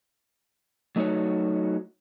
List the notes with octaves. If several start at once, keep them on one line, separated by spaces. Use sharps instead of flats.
F#3 A3 D#4 F#4 C#5